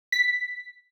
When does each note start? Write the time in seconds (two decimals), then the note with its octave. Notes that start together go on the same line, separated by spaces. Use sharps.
0.12 B6